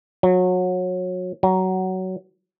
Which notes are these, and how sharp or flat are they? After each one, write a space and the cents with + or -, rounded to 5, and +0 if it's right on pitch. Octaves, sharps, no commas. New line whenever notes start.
F#3 -25
F#3 +15